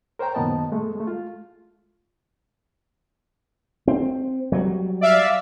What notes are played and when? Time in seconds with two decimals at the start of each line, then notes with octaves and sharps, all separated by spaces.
0.19 A#4 C5 C#5 G5 A#5
0.35 F#2 A#2 D#3 B3 D#5 A5
0.72 G#3 A3
0.96 G#3 A3
1.07 F4
3.88 C4
4.52 F#3 G3
5.01 D5 E5 F5